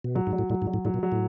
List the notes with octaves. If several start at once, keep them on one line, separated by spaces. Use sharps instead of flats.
B2
A#2 F#3
G#2
F#3
A2
A2 F#3
G#2
F#3
A2
A2 F#3
A#2
F#3
A2